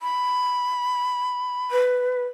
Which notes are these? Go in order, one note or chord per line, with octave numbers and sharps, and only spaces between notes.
B5
B4